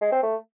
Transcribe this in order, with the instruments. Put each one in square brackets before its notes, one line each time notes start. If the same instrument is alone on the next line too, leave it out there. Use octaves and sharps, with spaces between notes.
[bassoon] G#3
C4
A3